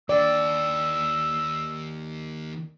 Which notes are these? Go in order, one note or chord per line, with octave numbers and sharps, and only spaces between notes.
D#2 D5 G5 E6